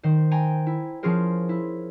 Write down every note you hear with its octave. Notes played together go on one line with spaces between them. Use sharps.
D#3 C5
G5 G#5 A#5
E4
F3 C#4 F4 G#4 A#4 C5
E4